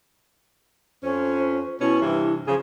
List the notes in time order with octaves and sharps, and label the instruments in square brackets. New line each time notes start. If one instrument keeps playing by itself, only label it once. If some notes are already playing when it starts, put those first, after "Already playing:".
[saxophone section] F2 C#4 [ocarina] C5
[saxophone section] B2 C#4 [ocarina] E4
[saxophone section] G2 C3 E3
C#3 F3 G#4